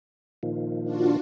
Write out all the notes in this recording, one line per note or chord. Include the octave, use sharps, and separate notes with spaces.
A#2 D#3 F3
D4 F4 F#4